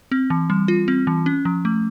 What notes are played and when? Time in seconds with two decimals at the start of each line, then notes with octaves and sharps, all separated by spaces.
0.11 C4
0.30 E3
0.50 G3
0.68 F4
0.88 C4
1.07 E3
1.26 C#4
1.45 F3
1.65 A3